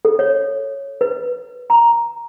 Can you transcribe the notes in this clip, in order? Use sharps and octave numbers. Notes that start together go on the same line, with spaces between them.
A4
C#5
B4
A#5